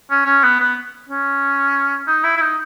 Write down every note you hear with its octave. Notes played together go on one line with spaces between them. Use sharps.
C#4
C#4
B3
B3
C#4
D#4
E4
E4
D#4